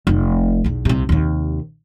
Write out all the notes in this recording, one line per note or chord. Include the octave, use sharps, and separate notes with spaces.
F1 C3
B1 E2
C2 C3
D#2 C3